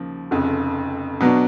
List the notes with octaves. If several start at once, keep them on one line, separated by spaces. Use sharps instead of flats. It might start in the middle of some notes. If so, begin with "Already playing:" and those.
Already playing: D#2 C#3 F3
F1 F2 C#3
B2 F#3 B3 D4